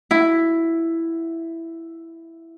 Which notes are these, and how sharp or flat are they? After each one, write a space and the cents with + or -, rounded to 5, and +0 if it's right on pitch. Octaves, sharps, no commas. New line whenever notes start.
E4 +5